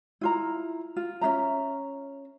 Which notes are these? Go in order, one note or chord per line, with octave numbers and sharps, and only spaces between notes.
E4 F4 A#5
F4
C#4 D4 E5 A#5